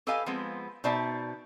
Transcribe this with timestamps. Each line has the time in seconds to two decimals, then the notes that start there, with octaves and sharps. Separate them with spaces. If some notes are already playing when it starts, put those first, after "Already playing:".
0.07 G4 A4 B4 D#5 F5 G#5
0.26 F3 G#3 B3 C4
0.84 B2 D#4 C5 D5 E5 A5